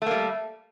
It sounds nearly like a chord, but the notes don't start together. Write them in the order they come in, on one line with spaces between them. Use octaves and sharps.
A3 A#3 G3